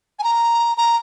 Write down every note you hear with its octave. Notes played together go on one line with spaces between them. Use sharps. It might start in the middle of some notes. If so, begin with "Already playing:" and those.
G#5
A#5
A#5